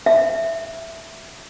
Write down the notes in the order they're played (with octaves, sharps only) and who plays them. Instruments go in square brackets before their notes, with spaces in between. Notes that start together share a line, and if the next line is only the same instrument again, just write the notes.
[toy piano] E5